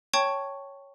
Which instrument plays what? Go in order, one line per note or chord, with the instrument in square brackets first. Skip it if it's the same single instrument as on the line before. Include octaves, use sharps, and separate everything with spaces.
[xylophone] C#5 G5 A5 C#6 G#6